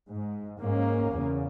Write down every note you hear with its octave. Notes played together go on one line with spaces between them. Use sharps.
G#2
G#2 A#3 C#4
E2 C#3